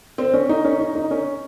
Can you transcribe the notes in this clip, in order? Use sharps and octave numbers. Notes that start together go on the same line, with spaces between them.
C4
C#4
D#4
C#4
D#4
D#4
C#4